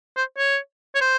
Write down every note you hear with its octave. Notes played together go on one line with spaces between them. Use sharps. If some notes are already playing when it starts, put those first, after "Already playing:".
C5
C#5
C#5
C5